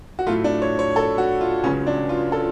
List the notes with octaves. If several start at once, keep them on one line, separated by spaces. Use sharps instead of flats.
F#4
A2 F#3 A3 F4
D4
C#5
C#5
A4
F#4
F4
C#2 C#3 F#3 C#4
D4
F4
A4